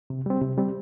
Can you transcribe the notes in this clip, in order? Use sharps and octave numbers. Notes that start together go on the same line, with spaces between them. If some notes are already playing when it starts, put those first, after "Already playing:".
C3
G3 C4
C3
G3 C4